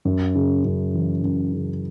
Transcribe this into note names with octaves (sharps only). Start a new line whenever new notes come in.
F#2
C#3
F#2
E3
F#2
C#3